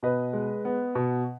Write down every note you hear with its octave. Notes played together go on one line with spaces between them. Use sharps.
B2 B4 D#5
G#3
B3
B2